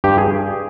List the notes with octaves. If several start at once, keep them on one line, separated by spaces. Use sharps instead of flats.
G2 G4
G#4